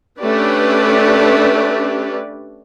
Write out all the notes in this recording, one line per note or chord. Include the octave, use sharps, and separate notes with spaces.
A3 C#4 D4 G4 B4 D5